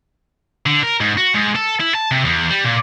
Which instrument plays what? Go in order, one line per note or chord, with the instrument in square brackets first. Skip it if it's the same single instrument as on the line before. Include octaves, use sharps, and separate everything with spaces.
[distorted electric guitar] D3
A#4
G#2
F#4
G#2
A4
E4
A5
C3
E2
G3
A#2